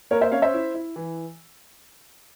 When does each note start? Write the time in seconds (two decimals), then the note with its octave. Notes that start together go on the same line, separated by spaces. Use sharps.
0.11 A#3 A#4 C#5
0.21 C5 E5
0.32 C#4 C#5 F5
0.42 C5 E5
0.54 E4
0.74 E4
0.96 E3